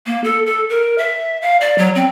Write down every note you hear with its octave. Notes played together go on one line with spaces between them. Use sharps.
A#3
A4
A4
A#4
E5
F5
D5
F#3
C4